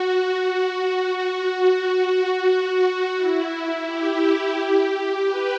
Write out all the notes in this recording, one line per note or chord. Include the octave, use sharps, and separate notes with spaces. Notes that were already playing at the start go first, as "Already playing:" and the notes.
Already playing: F#4
F#4
E4
G4
B4